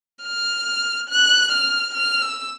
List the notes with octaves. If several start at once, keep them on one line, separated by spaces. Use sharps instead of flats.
F6
F#6
F6
F6
E6